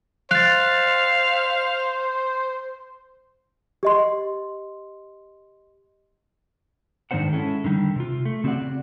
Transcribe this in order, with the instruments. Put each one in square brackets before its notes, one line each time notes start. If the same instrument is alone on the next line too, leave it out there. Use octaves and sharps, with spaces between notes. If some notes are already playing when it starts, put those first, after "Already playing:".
[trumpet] C5 [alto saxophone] F5 [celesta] F#6 A6
[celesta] G4 D#5 C6
[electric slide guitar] G#2 D#3 B3 D4 C5 F#5
G#3 C#4 E4 A4
D3 D#3 G3
C3 F4
A3
C#3 C4 F#4 G#4 D5 F#5